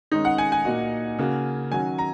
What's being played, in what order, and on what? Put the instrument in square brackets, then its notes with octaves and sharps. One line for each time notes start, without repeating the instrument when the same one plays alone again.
[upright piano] D#3 G#3 C#4 [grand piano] D#4
[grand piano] F#5
G#5
G#5
[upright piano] A#2 A#3 D#4 F#4
C#3 A#3 F#4
[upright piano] D#3 F#3 C#4 F#4 [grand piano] G#5
[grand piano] A#5